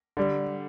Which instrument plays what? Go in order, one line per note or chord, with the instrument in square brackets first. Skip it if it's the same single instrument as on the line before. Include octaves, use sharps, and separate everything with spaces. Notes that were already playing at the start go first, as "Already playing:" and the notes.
[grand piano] D3 G3